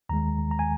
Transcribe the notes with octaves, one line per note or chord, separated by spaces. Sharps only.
D#2 D#3 G#3 A#5
A#5
G#5